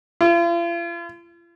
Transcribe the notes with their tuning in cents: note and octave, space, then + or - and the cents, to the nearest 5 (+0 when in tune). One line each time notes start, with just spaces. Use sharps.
F4 -45